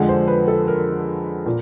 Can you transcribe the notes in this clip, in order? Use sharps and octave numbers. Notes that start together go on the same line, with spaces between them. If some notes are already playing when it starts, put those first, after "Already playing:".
Already playing: F2 D3 F3 G#3 F#5
C5
B4
A4
A#4
A#2